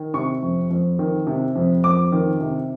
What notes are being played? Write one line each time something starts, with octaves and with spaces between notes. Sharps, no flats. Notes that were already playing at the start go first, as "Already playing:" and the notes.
Already playing: D#3
C3 C#6
F2
F2
D#3
C3
F2
F2 D6
D#3
C3